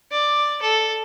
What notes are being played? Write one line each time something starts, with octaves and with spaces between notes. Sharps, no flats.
D5
A4